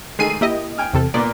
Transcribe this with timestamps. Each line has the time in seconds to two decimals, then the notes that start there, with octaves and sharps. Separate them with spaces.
0.19 D#3 G#3 A3 G#4 C7 D#7
0.41 A#3 E4 G4 D#5
0.78 G5 G#5 F6
0.93 E2 C3 A4
1.14 A#2 A#3 B3 D5